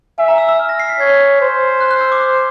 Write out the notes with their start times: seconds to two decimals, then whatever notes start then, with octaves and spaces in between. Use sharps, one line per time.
0.18 E5 G#5
0.28 A#5
0.38 E6
0.49 E6
0.59 F6
0.69 A#6
0.79 C7
0.89 B6
1.00 C#5 G#6
1.41 C5
1.81 F#6
1.91 F#6
2.01 E6
2.12 D6